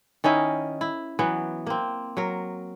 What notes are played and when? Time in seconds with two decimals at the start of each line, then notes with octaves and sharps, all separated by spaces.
0.24 D#3 C#4 D#4 E4
0.81 E4
1.19 E3 F#3 B3
1.67 A#3 C4
2.17 F#3 A#4